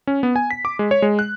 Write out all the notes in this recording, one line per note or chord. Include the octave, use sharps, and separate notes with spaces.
C#4
B3
G#5
B6
D6
G#3
C#5
G#3
F#6